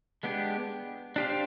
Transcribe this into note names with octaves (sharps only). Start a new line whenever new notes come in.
G#3 B3 D4 G4
D4 G4 C5 F5